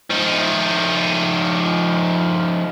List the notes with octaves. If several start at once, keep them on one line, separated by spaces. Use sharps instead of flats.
F3 D#4